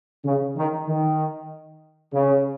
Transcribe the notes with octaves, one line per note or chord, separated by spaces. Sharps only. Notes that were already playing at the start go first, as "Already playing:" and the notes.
C#3
D#3
D#3
C#3